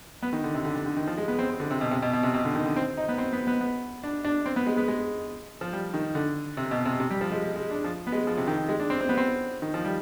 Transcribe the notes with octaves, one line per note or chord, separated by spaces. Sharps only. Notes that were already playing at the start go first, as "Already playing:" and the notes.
B3
D#3
D3
C3
D3
D3
D3
D#3
F3
G#3
B3
C4
C4
D3
C3
B2
C3
B2
B2
C3
B2
D3
D#3
D3
C4
D#4
B3
C4
B3
B3
B3
D4
D4
C4
B3
G#3
B3
G#3
F3
G3
D#3
D3
C3
B2
C3
C3
G3
F3
G#3
G#3
G#3
D4
F3
B3
G#3
F3
C3
D#3
G#3
D4
C4
C4
B3
C4
D#3
F3
G3